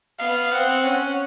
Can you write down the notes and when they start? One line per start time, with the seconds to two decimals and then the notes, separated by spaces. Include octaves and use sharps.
0.19 B3 F5
0.52 C4 F#5
0.84 C#4 F#5